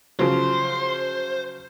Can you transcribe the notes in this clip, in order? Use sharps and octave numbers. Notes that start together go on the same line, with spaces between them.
C#3 F3 F#3 C5